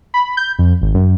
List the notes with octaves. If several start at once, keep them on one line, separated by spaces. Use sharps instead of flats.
B5
G6
F2
G#1
F#2